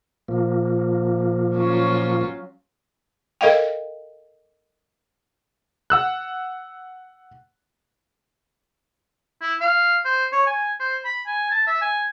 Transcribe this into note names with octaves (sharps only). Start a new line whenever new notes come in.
A#2 F3 A#3
F#3 C#4 F4
A4 A#4 D#5 F5 G5
F#5 E6 F#6
E4
F5
C5
C#5
G#5
C5
B5
G#5
A5
E5
G#5